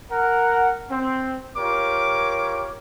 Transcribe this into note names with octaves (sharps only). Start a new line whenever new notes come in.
A#4 F#5
C4
F4 G4 A#4 C#5 D6